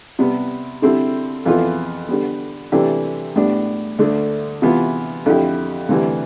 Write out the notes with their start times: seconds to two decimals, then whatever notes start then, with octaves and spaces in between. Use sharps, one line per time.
0.19 C3 G3 B3
0.82 D3 G3 C4 E4 A4
1.45 F2 E3 B3 F4 A4
2.09 D3 G3 B3
2.72 C3 E3 A3 D4 G4
3.36 A2 G3 B3 D4
3.99 D2 D3 A3 D4
4.62 C3 E3 B3 F4
5.26 F2 D3 A3 E4 G4
5.89 D2 C3 E3 G3